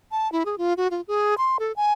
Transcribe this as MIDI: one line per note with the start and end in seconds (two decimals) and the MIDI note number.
0.11 0.30 81
0.32 0.43 64
0.45 0.56 68
0.58 0.73 65
0.77 0.88 66
0.91 1.01 65
1.08 1.35 68
1.38 1.57 84
1.59 1.72 69
1.76 1.93 80